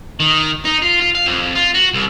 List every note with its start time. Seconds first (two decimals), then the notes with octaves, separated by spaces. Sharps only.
0.20 D#3
0.65 D#4
0.82 F4
1.01 F4
1.15 F5
1.26 F2
1.55 F4
1.74 F#4
1.93 C2